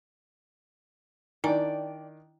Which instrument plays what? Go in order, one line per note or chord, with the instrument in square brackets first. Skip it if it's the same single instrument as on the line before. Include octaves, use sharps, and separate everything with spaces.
[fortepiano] D#3 D4 [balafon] E4 G#5 A#5 [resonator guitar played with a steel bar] D5 G5